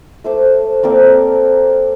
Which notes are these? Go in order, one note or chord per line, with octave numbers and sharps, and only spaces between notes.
A3 C5 D6
A#3 C4 A4 D5